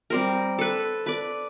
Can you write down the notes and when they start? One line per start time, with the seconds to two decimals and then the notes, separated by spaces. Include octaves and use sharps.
0.10 G3 C4 A#4
0.59 A4 B4
1.06 B4 D5